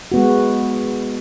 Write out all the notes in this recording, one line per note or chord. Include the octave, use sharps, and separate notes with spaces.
G#3 B3 F#4